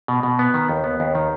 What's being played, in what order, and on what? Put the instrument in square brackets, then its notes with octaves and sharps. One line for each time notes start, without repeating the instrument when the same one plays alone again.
[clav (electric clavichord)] B2
B2
B3
D#3
D#2
B3
D#2
D#3